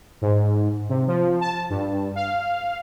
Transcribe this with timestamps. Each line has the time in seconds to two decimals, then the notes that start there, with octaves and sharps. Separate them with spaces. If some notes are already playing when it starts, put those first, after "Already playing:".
0.21 G#2
0.89 C3
1.07 F3
1.41 A5
1.70 G2
2.16 F5